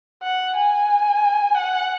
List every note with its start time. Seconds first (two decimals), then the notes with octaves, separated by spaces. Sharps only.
0.22 F#5
0.55 G#5
1.54 F#5